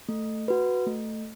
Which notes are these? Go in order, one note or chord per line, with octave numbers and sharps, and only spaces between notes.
A3
F#4 B4
A3